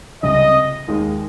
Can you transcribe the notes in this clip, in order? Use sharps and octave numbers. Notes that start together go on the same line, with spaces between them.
C#2 C3 G3 D#5
D#2 D#3 G#3